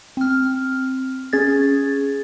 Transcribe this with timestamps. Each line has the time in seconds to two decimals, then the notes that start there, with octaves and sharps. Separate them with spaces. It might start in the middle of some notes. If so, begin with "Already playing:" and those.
0.17 C4 F6
1.33 C#4 G#4 G#6 A6